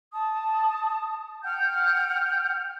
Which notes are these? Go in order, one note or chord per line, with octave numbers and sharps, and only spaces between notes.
A5 D#6
F#5 G5 F6 G6